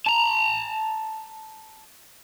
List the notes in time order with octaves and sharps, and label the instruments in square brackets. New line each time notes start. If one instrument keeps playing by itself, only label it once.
[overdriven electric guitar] A5 A#5